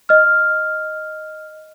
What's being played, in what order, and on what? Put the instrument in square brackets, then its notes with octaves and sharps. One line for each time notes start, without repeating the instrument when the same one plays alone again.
[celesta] D#5 F6